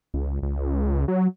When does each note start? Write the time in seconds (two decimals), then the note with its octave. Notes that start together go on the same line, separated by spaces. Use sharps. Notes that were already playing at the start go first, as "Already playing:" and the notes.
0.14 C#2
0.43 C#2
1.08 F#3